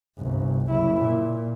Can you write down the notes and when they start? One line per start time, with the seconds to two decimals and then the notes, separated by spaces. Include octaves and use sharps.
0.18 G1 C2
0.68 F#1 E4
1.02 A#2